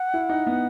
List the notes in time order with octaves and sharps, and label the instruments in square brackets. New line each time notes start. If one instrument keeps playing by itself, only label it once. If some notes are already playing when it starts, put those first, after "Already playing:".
Already playing: [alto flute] F#5
[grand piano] E4
D#4
B3